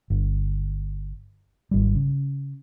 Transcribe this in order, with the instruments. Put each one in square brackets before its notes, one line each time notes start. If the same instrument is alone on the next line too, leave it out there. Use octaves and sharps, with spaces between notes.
[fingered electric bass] G1
G#1 G3
C#3